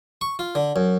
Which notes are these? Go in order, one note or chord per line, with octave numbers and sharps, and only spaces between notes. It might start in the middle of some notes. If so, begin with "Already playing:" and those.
C#6
F4
D3
F#2